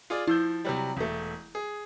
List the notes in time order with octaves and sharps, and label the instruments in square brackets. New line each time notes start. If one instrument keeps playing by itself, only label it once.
[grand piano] F4 G#4 D5
[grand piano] F3 E6 G6 [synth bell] E4
[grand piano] C3 F#3 G3
E1 A3
G#4